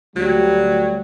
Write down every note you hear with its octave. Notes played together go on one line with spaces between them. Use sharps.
D2 F#3 G3